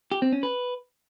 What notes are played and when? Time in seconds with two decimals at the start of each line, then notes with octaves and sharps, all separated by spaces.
0.12 G4
0.22 C4
0.33 C#4
0.43 B4